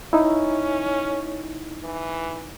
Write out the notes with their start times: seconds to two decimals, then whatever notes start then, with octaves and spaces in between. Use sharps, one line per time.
0.13 C#4 D#4 E4
1.84 E3